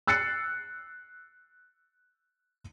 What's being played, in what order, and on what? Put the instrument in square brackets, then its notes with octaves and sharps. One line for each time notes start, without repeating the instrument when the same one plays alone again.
[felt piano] E6 F#6 A6 C7 C#7